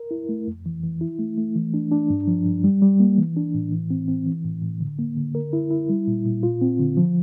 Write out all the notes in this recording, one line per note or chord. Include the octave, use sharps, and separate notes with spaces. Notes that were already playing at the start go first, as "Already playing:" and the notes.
Already playing: A#4
E4
A3
F2
E3
E3
E4
A3
A3
E3
D4
D4
G2
F3
G2
G3
G3
A#3
E3
D4
A2
E3
C4
C4
E3
A2
A2
D3
A#3
D3
A#4
E4
E4
G3
A#2
A#2
F4
C4
D3
F3